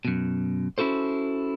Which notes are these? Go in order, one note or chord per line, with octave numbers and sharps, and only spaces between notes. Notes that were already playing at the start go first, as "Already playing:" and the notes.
F#2 B2
C#4 E4 F#4 A4 C5